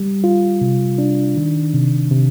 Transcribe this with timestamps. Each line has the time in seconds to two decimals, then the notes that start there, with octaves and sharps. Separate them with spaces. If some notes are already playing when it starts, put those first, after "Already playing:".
Already playing: G3
0.24 F4
0.61 C3
0.98 D4
1.36 D#3
1.74 C3
2.11 C3